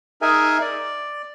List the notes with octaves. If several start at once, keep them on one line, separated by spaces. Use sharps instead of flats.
D#4 G#4 A#4 E5 G#5
D5